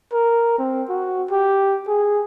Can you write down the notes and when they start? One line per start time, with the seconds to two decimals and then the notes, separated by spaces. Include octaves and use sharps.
0.13 A#4
0.58 C4
0.89 F#4
1.31 G4
1.88 G#4